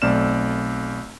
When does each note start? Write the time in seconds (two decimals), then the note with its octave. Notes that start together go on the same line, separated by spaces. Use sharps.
0.02 B1 A3 C4 D5 F6 E7